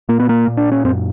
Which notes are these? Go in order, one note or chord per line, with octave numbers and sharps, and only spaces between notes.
A#2 A#3
B3
A#3
A#2
D4
C#4
F#2 C4